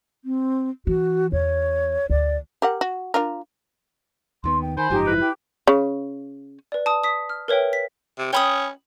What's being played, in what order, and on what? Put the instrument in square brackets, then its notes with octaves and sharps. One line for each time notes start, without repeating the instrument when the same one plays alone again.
[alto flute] C4
[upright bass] E3 [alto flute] F#4
[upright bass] E2 [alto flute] C#5
[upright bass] D2 [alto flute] D5
[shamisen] G4 A#4 F#5
F#4
D4 F4 A#4
[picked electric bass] D#2 D#3 B3 [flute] C6
[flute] G5
[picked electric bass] D#3 [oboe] C5 [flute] G#5 [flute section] B5
[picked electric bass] F#1 G#2 F3 [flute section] D#4 G4
[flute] E4 [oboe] B4
[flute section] G4
[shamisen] C#3
[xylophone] B4 D5
A5 D#6
D#6 B6
F6
A#4 B4 C#5 E5 G5
B6
[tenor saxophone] C3
[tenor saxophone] C#4 [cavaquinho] G5 B5 D#6